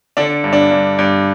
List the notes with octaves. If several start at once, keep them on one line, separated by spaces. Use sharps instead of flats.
D3 D4
G2
D4
G2
G2